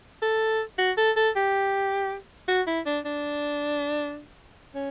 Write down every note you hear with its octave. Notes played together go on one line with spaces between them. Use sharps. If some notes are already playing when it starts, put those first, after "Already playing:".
A4
F#4
A4
A4
G4
F#4
E4
D4
D4
C#4